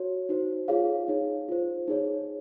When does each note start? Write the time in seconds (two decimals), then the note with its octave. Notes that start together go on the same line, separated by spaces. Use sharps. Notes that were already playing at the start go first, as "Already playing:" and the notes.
Already playing: F#4 C#5
0.29 D#4 F#4 C5
0.68 F4 G#4 C#5 F5
1.08 D#4 G#4 C#5
1.48 F4 C5
1.88 D#4 G#4 C#5